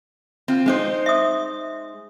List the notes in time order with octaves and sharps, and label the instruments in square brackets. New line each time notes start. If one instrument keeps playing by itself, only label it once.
[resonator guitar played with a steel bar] C4 F4
G#3 D#4 C5
[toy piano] E5 D#6